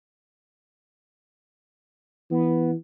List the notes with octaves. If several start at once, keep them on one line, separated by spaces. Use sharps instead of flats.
E3 B3